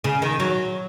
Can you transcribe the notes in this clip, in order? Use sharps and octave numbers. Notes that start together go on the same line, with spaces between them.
C#3
D#3
F#3